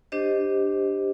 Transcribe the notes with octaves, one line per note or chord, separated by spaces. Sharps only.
D4 G4 C5 D#5